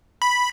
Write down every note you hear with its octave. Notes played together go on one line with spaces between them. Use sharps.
B5